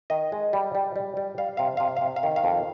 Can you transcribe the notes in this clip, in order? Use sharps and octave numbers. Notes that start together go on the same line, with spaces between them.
D#3 D#5
G#3
G3
G3
G3
G3
G3 F5
C3 F5
C3 F5
C3 F5
F5
D#3
F5
F2